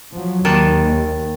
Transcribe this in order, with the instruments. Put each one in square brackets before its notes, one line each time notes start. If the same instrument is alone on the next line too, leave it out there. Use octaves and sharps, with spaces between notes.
[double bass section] F3 F#3
[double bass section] D#2 [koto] D#3 D4